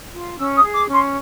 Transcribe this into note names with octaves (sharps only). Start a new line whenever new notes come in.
F4
C#4 E6
D#6
G#4
D6
C#4
C6